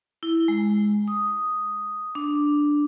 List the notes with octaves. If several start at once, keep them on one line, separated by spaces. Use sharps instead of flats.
E4
G#3
D#6
D4